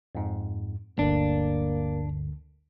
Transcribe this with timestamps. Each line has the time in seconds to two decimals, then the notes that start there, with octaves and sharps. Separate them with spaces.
0.15 F2 G#2
0.99 G1 D2 D3 A#3 D4